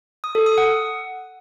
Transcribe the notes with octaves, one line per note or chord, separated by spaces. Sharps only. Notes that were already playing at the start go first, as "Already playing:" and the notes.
D#6
A4
D#6
F#5